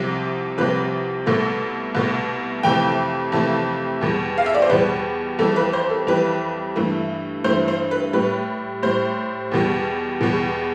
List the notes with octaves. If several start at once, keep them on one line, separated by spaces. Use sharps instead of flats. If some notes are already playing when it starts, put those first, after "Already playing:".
Already playing: C2 C3 F3
C2 C3 F3 B4
C2 B2 A3 A4
C2 B2 A3
F2 C3 E3 A3 G5
F2 C3 E3 A3 A5
E2 B2 G3
F5
E5
D5
C5
E2 B2 G3 B4
F2 E3 G3 A4
B4
C5
A4
F2 E3 G3 B4
G2 E3 A3
G2 E3 A3 C5
C5
B4
A2 G3 B4
A2 G3 C5
E2 B2 G3
E2 B2 G3